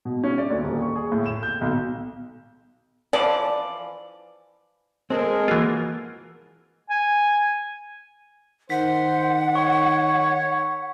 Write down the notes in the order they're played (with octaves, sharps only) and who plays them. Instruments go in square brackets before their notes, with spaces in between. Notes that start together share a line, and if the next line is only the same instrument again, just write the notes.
[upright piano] B2
C#4
D5
D2
D#1
C#6
G#4
A2
E7
G6
B1
[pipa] E3 F3 D5
[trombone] G#3 [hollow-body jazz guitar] C4 A4 [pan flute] A#4
[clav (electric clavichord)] E3 F4 [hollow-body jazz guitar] A#3 F#4
[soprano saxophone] G#5
[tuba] D#3 [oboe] C5 [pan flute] F#5 [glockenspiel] B6
[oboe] C#5 [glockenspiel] C#6